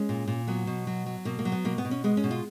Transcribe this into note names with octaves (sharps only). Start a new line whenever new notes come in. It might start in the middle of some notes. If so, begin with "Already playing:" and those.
Already playing: G#3 C#4
A#2
A#2
F#3 B3
B2
F#3
F#3
B2 A#3
A#3
F#3
B3
B2 A#3
B3
B2
C#4
G#3 B3
C#4
B2
F4